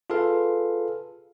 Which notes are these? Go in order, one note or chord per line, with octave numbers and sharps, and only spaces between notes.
F4 G#4 A4 B4 F5